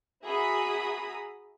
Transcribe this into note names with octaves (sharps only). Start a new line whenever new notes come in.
F#4 G#4 E5 A#5 B5 D#6